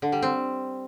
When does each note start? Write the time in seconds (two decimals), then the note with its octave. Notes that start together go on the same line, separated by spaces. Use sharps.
0.02 D3
0.12 G3
0.22 C4